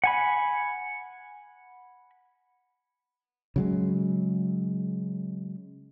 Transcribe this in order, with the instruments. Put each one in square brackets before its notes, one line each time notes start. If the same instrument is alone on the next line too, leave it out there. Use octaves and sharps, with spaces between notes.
[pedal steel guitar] F#5 G#5 B5
[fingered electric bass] C#3 F#3 G#3